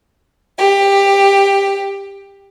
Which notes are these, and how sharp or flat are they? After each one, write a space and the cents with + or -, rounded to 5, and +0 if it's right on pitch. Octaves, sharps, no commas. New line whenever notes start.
G4 +15